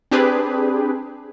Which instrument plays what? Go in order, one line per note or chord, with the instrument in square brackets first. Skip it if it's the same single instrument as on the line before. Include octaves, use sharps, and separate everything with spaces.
[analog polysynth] C4 D4 G4 G#4 B4